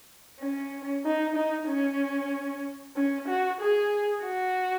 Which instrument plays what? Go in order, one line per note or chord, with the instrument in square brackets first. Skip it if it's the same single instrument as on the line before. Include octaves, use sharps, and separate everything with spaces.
[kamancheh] C#4
D#4
D#4
C#4
C#4
F#4
G#4
F#4